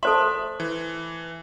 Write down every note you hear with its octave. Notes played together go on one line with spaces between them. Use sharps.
A3 A4 C5 E5 C6
E3